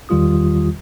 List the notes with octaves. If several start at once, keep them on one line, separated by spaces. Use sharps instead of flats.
E2 D#3 G3 F4 G4 D#6